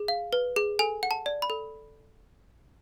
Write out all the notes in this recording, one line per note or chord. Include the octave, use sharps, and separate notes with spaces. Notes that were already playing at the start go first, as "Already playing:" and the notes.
Already playing: G#4
F5
B4
G#4
A4 G#5
F#5
A5
D5
B5
A4